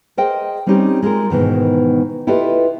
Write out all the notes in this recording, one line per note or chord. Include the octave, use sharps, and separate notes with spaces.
G#4 A#4 C5 D#5 G5
G3 C4 C#4 D#4 G4 A4
G#3 F4 A4 A#4
G#2 B2 D#3 E3
E4 F4 G4 A4 B4 D#5